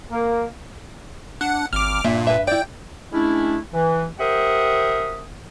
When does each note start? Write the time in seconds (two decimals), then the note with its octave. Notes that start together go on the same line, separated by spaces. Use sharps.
0.10 A#3
1.41 D4 F#5
1.73 G#1 D6 F6
2.04 G2 A#2 E5
2.27 B4 E5
2.47 E4 D5 G5
3.12 G#3 A3 C#4 D4 E4
3.73 E3
4.19 G4 A#4 C5 E5 F#5 D#6